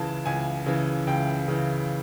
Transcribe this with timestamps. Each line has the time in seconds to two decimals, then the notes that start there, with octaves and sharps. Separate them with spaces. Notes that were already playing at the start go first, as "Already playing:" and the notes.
Already playing: C#2 C#3 E3 A5
0.26 C#2 G#5
0.66 C#3 E3
1.07 C#2 G5
1.48 C#3 E3